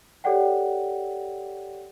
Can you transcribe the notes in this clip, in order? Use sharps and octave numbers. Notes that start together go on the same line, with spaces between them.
G4 A4 C#5 D5 F#5 G5